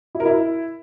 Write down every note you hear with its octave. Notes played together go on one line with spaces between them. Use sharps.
E4
A#4
E4